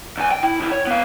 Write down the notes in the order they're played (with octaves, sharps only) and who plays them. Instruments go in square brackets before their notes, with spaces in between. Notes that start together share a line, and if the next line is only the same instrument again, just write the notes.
[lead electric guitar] E2 G#5
G5
E4
D#2 E4
C#5
B3 F5